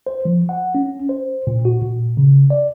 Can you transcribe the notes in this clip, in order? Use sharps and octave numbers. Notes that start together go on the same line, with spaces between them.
C5
F3
F#5
C#4
C5
A#2
F#4
A#2
C#3
D5